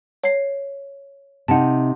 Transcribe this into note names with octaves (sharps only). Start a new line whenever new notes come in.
C#5 C7
C3 D#4 F#5 A5